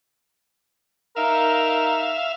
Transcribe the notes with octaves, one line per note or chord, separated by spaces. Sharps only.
D#4 A#4 E5 F5